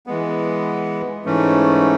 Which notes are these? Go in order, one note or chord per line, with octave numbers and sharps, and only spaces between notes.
E3 G#3 B3
G#2 E3 A3 C#4